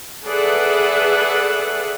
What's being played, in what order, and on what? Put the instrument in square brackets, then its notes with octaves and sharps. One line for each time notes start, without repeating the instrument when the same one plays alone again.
[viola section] G#4 A4 B4 D5 E5 F#5